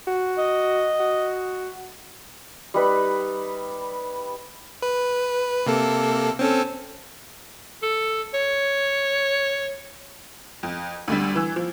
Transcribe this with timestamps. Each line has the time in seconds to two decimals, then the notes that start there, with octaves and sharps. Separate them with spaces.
0.07 F#4
0.38 D#5
1.00 F#4
2.74 G3 D#4 B4 B5
4.82 B4
5.66 C3 A#3 A4
6.39 C4 C#4 A4
7.83 A4
8.34 C#5
10.63 F2
11.08 D2 D3 G3
11.35 E3 E6
11.56 F3